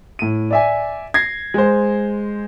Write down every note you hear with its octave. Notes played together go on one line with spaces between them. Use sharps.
A2 D#7
D5 E5 G#5
G#6 A#6 C7
G#3 C5